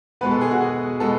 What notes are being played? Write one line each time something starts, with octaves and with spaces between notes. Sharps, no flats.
B2 G#3 B3 B4
A4
G#4
F#4
G#4
B2 G#3 B3 A4